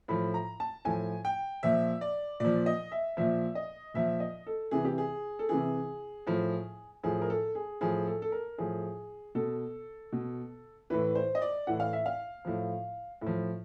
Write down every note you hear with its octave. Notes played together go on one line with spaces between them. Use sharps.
A2 F3 B5
A#5
A5
A2 F3 G#5
G5
A#2 F3 E5
D5
A#2 F3 D5
D#5
E5
A#2 F3 E5
D#5
A#2 F3 E5
D#5
A4
C3 E3 G#4
G4
G#4
A4
C3 E3 G#4
A2 F3
A2 F3 G#4
A#4
A4
G#4
A2 F3 G#4
A4
A4
A#4
A2 F3 G#4
B2 A4
B2
A2 E3 B4
C5
D#5
D5
A2 E3 F#5
F5
E5
F5
A2 F3
A2 F3